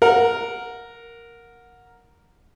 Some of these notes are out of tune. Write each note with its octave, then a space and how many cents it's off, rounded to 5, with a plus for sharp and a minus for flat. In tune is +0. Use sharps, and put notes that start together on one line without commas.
A#4 +0 F#5 -20